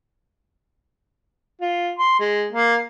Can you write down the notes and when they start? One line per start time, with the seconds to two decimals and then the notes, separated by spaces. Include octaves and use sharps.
1.61 F4
1.99 C6
2.20 G#3
2.53 A#3